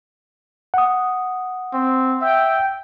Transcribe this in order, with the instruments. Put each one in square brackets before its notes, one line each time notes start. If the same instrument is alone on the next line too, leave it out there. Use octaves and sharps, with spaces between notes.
[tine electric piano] F#5 D#6
[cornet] C4
[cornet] E5 [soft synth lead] G5